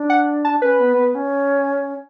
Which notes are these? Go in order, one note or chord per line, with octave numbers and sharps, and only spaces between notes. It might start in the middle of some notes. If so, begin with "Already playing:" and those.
Already playing: D4
F#5
A5
C#4 B4
B3
B3
C#4